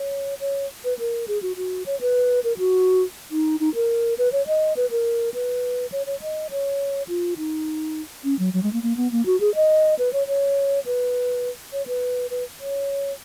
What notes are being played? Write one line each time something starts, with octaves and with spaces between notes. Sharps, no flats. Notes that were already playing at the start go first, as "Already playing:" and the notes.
Already playing: C#5
C#5
B4
A#4
G#4
F#4
F#4
C#5
B4
A#4
F#4
D#4
D#4
A#4
B4
C#5
D#5
B4
A#4
B4
C#5
C#5
D#5
C#5
F4
D#4
C#4
F#3
F#3
G#3
A#3
A#3
B3
A#3
F#4
G#4
D#5
B4
C#5
C#5
B4
C#5
B4
B4
C#5